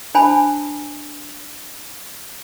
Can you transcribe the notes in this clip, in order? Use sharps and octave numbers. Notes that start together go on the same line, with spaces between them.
D4 C5 G#5 A5 B5